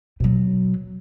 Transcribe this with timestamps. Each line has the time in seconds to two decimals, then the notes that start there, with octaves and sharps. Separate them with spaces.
0.20 B2 F#3